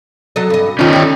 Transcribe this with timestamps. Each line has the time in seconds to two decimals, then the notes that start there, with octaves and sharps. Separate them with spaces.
0.36 F#3 A4 D#5
0.50 G2 D#5
0.79 D#3 C#4 D#4 F4
0.93 G4 A4